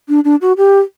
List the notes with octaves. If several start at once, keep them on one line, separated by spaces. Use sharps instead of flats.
D4
D4
F#4
G4